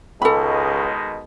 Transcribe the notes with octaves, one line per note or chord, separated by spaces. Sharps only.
C#2 B2 D#3 G#3 A4 B5